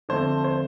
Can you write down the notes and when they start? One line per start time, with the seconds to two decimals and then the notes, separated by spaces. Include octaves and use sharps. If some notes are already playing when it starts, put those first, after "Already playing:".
0.09 D3 F3 A3 C4 C5
0.44 C5